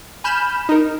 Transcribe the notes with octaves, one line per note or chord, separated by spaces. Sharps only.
G#5 B5 F6 G6 E7
D#4 A#4